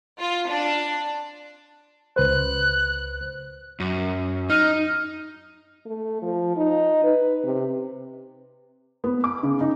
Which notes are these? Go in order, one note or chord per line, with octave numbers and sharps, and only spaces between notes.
F4
D4
C#2 B4 C5 F#6
F#2
D#4 F6
A3
F3
D#4
B4
C3
B3
D6
C#3
D#4